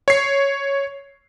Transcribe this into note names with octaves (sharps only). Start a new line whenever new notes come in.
C#5 C7